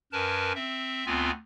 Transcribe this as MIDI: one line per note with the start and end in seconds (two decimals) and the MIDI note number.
0.12 0.53 42
0.12 0.53 70
0.12 0.53 71
0.12 0.53 80
0.12 0.53 81
0.55 1.06 60
0.55 1.06 76
1.06 1.31 38
1.06 1.31 59
1.06 1.31 60
1.06 1.31 65
1.06 1.31 80